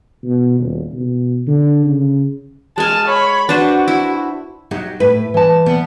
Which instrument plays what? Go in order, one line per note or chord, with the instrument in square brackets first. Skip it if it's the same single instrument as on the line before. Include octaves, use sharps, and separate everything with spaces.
[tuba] B2
D#1
B2
D3
C#3
[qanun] G#3 G#5 [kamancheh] A5 F6
[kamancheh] C#5 B5
[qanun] D4 B4 C5 [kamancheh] F#4
[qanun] E4
[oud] F#3 D#4 [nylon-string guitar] G4
[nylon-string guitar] A2 [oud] B4
[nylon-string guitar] E3 A5
[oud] G3 B3